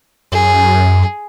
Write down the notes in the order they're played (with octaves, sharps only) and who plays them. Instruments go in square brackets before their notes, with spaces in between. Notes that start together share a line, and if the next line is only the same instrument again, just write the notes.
[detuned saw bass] F#2 [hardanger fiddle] G#4